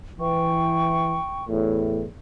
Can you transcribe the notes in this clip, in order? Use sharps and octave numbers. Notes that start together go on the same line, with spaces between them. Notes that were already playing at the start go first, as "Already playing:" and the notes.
E3 G5 C#6
E2 A2